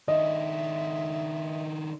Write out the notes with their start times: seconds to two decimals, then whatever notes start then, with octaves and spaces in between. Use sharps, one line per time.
0.08 D#3 D4 D#5 E5